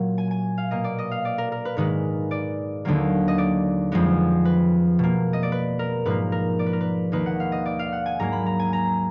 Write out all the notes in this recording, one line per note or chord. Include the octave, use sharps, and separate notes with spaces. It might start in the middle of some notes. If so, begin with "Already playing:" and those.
Already playing: A#2 F#3 A#3
G#5
G#5
F5
B2 A#3 D#5
D5
D#5
F5
D5
A#4
A#4
B4
G#2 D#3 G#3 B4
D5
D#2 D3 F#3 A#3
D#5
D5
F2 F3 G#3 B3
B4
B2 A#3
D#5
D5
B4
A#4
G#2 F3 A#3 B4
A#4
D5
B4
A#4
B4
D#2 D#3 A#3 B4
F#5
F5
D#5
D5
F5
F#5
G#5
G#2 F#3 A#3 A#5
B5
A#5
G#5
A#5